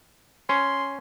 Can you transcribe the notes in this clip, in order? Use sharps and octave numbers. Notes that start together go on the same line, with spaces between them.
C#4 C6